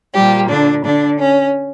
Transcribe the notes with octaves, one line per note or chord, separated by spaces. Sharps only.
A#2 F3 G3 A#3 G4
D3 D4
D3 D4
C#4